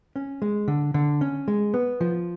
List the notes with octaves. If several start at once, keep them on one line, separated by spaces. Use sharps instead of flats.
C#4
G#3
D3
D3
C#4
G#3
B3
F3